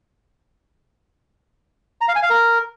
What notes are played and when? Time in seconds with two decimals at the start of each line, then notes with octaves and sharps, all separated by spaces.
2.01 A#5
2.08 F5
2.16 G#5
2.23 F5
2.30 A#4